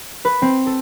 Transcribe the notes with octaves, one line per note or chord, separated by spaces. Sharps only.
B4
C4
A4